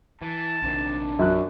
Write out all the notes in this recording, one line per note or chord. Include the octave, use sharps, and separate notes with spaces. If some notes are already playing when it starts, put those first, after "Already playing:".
E3 A5
A#1 C3 D#3 D4
F#2 F#4 F#6